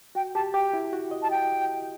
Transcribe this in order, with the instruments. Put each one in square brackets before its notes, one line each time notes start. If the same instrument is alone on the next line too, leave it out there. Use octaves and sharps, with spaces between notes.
[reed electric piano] F#4 [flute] G5
[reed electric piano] G4 [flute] A5
[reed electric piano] G4 [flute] G5
[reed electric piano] E4
F#4
D#5
[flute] A5
G5